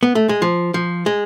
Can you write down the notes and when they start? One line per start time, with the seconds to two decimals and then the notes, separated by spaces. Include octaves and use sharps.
0.03 B3
0.15 A3
0.29 G#3
0.42 F3
0.74 F3
1.06 G#3